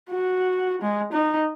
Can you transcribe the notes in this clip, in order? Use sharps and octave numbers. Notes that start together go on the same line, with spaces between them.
F#4
G#3
D#4